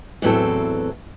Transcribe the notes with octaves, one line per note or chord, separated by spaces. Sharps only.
E2 A2 F#3 C4 A4